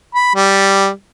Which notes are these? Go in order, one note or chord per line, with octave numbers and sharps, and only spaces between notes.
B5
G3